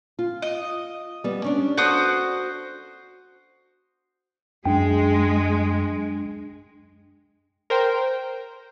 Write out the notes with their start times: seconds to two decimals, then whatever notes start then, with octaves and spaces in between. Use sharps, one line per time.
0.19 F4
0.42 D#5
1.24 G3 B3
1.44 C#4 D4
1.77 F#4 A4 C5 D#6
4.65 F#2 G#3 D4 G5
7.70 A#4 C5 G5